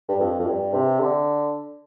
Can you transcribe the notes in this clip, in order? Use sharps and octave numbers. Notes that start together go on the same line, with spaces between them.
G2
F2
F2
G2
C3
D3